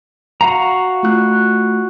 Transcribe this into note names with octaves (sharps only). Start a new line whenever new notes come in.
F#4 F5 A#5
A3 F4 F#6